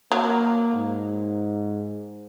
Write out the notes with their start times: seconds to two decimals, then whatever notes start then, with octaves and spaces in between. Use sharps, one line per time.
0.12 F#3 A#3
0.73 G#2